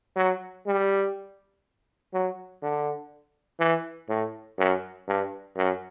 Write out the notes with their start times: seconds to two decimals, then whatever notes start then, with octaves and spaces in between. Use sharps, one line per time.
0.16 F#3
0.67 G3
2.14 F#3
2.62 D3
3.60 E3
4.09 A2
4.58 F#2
5.08 G2
5.56 F#2